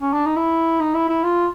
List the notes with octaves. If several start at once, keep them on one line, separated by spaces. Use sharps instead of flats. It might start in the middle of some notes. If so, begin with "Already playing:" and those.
C#4
D4
D#4
E4
D#4
E4
E4
F4